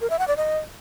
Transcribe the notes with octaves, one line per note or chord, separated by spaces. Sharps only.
A#4
E5
F#5
D5
D#5